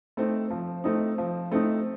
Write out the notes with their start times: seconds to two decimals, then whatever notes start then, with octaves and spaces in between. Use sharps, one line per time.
0.17 A3 C4 D#4
0.50 F3
0.84 A3 C4 D#4
1.18 F3
1.51 A3 C4 D#4